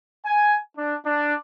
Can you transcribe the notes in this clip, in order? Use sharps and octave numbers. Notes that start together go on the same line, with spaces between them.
G#5
D4
D4